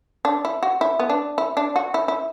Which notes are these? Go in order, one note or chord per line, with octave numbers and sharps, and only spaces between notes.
D4
E4
F#4
E4
B3
D4
E4
D4
F#4
E4
E4